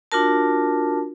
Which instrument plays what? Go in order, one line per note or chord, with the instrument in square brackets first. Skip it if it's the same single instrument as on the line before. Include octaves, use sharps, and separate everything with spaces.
[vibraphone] D4 F4 F#4 A#4 A5